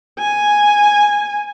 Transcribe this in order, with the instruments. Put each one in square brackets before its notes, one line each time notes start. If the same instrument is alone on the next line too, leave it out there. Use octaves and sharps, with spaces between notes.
[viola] G#5